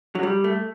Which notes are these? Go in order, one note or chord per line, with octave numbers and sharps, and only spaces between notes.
F#3
G3
A3